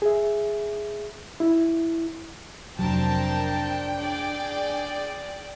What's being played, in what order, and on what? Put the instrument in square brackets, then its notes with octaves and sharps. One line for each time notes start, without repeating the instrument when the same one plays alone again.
[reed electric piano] G#4 E5
E4
[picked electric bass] F1 F#3 [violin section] C4 A#4 A5 [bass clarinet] D4 [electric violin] G5
[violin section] G#4 D5 D7